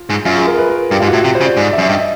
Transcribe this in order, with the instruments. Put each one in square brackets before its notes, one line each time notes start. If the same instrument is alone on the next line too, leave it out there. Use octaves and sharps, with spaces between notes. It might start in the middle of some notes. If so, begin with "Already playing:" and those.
Already playing: [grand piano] F4
[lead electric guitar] G#2
[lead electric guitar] F#2 [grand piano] F4
[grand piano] G#4
A#4
B4
A#4
[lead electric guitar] G2 [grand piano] G4
[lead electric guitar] G#2 [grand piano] F4
[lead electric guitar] A2 [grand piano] F#4
[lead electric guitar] C3
[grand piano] C5
[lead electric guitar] C#3
[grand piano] D5
[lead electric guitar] G#2 [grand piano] D5
[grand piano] E5
[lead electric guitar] F#2
[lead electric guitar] G2 [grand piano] D#5